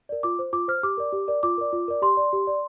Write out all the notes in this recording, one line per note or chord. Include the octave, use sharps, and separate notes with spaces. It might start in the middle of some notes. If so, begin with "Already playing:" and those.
A#4 D5
F4 D6
C5
F4 D6
C5 F6
G4 D6
A#4 D5
G4
A#4 D5
F4 D6
A#4 D5
F4
A#4 D5
G4 C6
D5
G4
D5